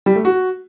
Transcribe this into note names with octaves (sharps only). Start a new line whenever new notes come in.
G3
A3
F#4